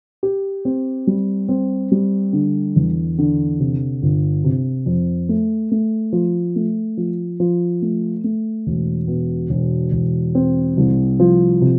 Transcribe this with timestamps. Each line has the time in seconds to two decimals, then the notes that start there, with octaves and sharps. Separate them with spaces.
0.23 G4
0.65 C4
1.07 G3
1.49 C4
1.92 G3
2.33 D3
2.76 E2
3.18 D3
3.60 C3
4.02 G1
4.44 C3
4.86 F2
5.29 A3
5.71 A3
6.12 F3
6.56 A3
6.97 F3
7.40 F3
7.82 A3
8.24 A3
8.67 E1
9.08 B2
9.50 E1
9.92 E1
10.35 C4
10.77 C2
11.20 F3
11.61 C3